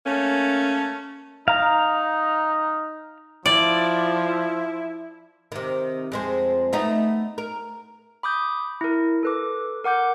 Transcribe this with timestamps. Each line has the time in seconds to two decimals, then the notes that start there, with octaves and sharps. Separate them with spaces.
0.04 A3 A#3 C#4
1.48 D#4 F5 A#5
3.46 F3 E4 D5
5.52 C3 D#3
6.12 F2 G#3 C4
6.73 A3 B3 D#4
7.38 A#4
8.23 B5 D6 D#6 G6
8.81 E4 A#4
9.23 A4 B4 D6
9.84 A#4 F#5 D6 G6